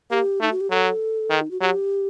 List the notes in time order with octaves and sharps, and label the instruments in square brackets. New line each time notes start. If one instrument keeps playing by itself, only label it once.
[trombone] A#3 [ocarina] G4
[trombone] A3 [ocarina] D#4
[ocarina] F#4
G4
[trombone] F#3 [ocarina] A4
[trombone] D#3
[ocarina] D#4
F#4
[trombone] F#3 [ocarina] G4